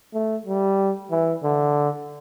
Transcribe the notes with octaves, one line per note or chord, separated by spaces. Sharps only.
A3
G3
E3
D3